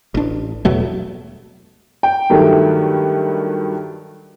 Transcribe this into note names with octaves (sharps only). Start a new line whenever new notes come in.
A1 D4
E2 B2 F#3 A3
G5
G2 D#3 F#3 A3